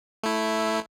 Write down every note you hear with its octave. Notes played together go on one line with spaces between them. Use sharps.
A3 E4